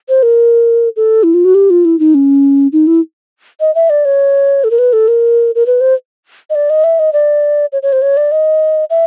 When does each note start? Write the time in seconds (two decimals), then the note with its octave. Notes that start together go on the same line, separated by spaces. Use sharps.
0.09 C5
0.23 A#4
0.96 A4
1.23 E4
1.34 F4
1.45 F#4
1.55 G4
1.70 F4
1.85 E4
1.99 D#4
2.14 C#4
2.73 D#4
2.87 E4
3.60 D#5
3.75 E5
3.90 D5
4.05 C#5
4.64 A4
4.71 A#4
4.79 B4
4.93 A4
5.08 A#4
5.55 A#4
5.66 B4
5.81 C5
6.50 D#5
6.55 D5
6.70 D#5
6.84 E5
6.99 D#5
7.13 D5
7.73 C#5
7.83 C#5
7.92 C5
8.02 C#5
8.17 D5
8.32 D#5
8.90 E5